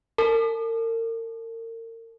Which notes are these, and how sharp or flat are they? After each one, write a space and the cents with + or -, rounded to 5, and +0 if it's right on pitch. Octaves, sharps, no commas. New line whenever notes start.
A#4 -40 A5 -30